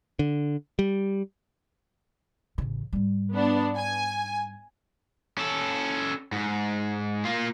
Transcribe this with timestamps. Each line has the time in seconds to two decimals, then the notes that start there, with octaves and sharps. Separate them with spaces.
0.19 D3
0.79 G3
2.58 A1 C#3
2.93 G#2 G3
3.34 B3 D4
3.78 G#5
5.38 C#4 A4
6.32 G#2
7.25 A#3 F4